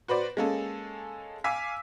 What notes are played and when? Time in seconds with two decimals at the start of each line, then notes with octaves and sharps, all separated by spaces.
0.08 F#4 B4 C5 D5
0.37 G#3 A#3 C#4 G#4 A4
1.44 F5 G#5 D6 E6 B6